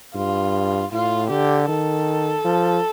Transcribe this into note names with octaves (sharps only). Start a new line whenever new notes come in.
G2 F4
A2 F4
D3 G4
D#3 A4
F3